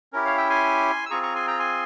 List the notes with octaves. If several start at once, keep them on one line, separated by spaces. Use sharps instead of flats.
C#4 E4 G4 A#4
C#5 F5
E5 G5
G#5 C6
E6
C4 F4 G#4 A#5 C#6
A#5 C#6
G#5 C6
G5 A#5
G#5 C6